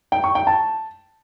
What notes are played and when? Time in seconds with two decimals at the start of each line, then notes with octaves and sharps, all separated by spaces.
0.12 G5
0.24 C#6
0.35 G5
0.47 A5